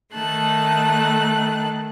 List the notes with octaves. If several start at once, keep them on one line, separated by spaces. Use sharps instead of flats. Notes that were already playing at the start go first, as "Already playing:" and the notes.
D#3 A3 A5 F#6